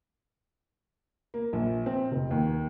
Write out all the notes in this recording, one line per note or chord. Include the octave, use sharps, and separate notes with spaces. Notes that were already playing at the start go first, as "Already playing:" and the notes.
A#3
A#1
C4
F1
D#2